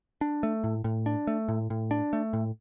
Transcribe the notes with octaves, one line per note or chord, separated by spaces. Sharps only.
D4
A3
A2
A2
D4
A3
A2
A2
D4
A3
A2